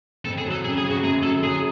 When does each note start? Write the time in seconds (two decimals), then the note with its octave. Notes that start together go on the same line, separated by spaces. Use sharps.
0.25 F2 A4
0.38 G#4
0.45 F#3
0.51 A4
0.64 C#3 G#4
0.78 G#4
0.84 C#3
0.91 F#4
1.03 F#2 G#4
1.23 F#2 A4
1.42 F#3 G#4